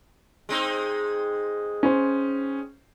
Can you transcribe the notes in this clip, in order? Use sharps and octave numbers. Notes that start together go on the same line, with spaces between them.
G#3 C4 D#4
C#4 C5